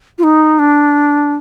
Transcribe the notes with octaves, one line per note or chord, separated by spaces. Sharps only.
F4
D#4
D4